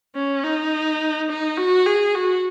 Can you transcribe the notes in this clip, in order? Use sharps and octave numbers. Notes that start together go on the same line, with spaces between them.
C#4
D#4
D#4
F#4
G#4
F#4